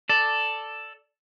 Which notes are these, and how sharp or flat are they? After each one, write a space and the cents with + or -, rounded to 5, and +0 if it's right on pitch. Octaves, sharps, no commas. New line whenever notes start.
A4 +0 D5 +0